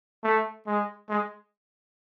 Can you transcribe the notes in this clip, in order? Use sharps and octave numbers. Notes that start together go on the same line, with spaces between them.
A3
G#3
G#3